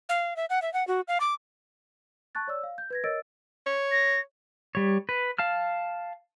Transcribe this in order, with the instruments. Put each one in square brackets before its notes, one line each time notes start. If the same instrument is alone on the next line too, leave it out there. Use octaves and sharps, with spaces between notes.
[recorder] F5
E5
F#5
E5
F#5
F#4
F5
D6
[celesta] A5 C#6 F#6 A6
C#5 D5 E6
F5
G6
B4 G#6 A#6
A#4 C#5 D#5 E6 A6 D7
[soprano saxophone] C#5
[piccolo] A#6
[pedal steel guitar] G3 C#5
B4
F5 A5 F6